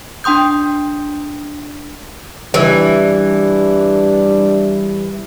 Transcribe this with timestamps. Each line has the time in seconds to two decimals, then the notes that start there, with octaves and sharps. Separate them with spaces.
0.24 D4 G5 C6 D#6 G6
2.54 E3 G3 D4